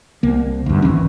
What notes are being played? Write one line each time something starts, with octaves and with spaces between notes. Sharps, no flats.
C2 A#3
D2 G2
G#1 D#3 E3 C#4